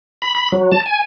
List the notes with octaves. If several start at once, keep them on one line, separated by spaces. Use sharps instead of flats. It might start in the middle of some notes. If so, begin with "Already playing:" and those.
B5
B5
F#3
A5
G#5